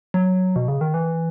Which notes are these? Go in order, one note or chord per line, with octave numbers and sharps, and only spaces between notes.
F#3
B2
C#3
D#3
E3